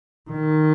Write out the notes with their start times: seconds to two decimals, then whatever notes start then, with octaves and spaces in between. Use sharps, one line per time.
0.30 D#3